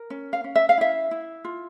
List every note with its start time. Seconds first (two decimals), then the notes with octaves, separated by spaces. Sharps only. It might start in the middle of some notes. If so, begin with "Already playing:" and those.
Already playing: A#4
0.10 C#4
0.33 F5
0.44 C#4
0.56 E5
0.69 F5
0.78 E4 E5
1.11 E4
1.45 F4